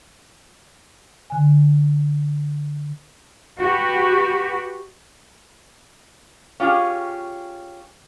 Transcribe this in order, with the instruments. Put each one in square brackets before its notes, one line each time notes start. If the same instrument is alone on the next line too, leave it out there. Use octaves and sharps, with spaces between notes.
[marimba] D3 G#5
[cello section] F#4 G4 B4
[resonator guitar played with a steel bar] C#4 F4 G4 G#4